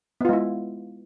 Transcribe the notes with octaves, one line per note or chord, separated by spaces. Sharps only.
G#3 B3 E4 F4